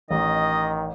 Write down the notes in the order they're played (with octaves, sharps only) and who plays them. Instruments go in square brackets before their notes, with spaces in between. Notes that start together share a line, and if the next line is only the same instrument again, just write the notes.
[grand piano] A1 [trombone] D#3 [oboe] D#5